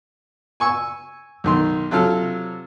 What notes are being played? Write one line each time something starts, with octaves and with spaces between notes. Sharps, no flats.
G#5 C#6 E6
B1 D#3 C6
C3 F#3 F4 A4 F6